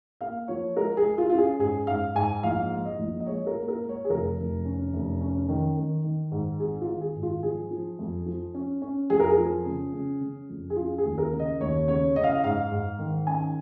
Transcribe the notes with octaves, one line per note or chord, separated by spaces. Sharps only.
A#3 F5
F3 C#5
G#3 A#4
G#4
G#3
F4
C#4 F4
G#4
G#2 G#4
G#2 F5
G#2 G#5
A#1 F5
G#3
D#5
A#1
D#5
G#3 C#5
A#4
A#2
A#4
G#3
C#5
G#4
F1 A#4
F1
C#4
F1
C#4
D#3
D#3
D#3
G#2
G#1 G#4
F4
D#3
G#4
G#2
F4
F3 G#4
F3
F2
F3
C#4
C#4
F2 G#4
A#4
G#4
F3
C#3
C#3
C#3
F2
G#4
C#4 F4
G#4
D#2
A#4
C#3
D#5
D#2 C#5
C#3 C#5
C#3 D#5
F5
D#5
G#2 F5
G#2
D#3
C#4 G#5